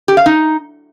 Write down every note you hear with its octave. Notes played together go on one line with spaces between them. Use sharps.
G4
F5
D#4